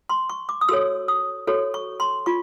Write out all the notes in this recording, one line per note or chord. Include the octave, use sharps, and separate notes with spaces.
C6
C#6
D6
D#6
F#4 A4 C#5 E6
D#6
F#4 A4 C#5
C#6
C6
F4 C#6